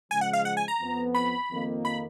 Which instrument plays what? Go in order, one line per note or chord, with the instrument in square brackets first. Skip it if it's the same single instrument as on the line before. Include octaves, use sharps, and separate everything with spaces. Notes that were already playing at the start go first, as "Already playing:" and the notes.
[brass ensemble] C#3 F3 G#3 [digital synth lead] G#5
[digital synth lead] F#5
F5
F#5
G#5
A#5
[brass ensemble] F2 F3 B3
[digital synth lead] B5
[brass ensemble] F2 D#3 A#3
[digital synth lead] B5